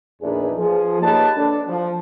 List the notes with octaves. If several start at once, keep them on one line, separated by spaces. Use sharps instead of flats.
A#1 E2 D4 D#4 G#4 B4
F3 G#4
A#3 D#4 G4 B4 C#5 A5
D4 A4
F3